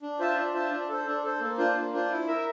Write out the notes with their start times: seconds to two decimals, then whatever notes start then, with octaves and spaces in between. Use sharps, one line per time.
0.02 D4
0.19 F4 C5 E5 A5
0.36 D4
0.53 F4 C5 E5 A5
0.71 D4
0.89 A4 C5
1.06 D4
1.23 A4 C5
1.40 A#3
1.57 D4 F4 C5
1.75 A#3
1.93 D4 F4 C5
2.10 E4
2.27 A#4 E5